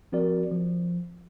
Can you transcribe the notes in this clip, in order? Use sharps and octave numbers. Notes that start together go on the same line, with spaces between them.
F3 C4 F#4 A#4 D5
F3